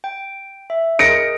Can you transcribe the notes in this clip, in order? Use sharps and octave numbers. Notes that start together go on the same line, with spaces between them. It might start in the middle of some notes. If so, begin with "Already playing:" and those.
G5
E5
G#4 A#4 D#5 A#6 C#7 D7